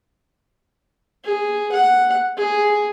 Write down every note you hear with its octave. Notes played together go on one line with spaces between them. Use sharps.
G#4
F#5
G#4